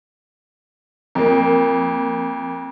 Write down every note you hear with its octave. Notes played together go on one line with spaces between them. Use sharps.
F2 A#3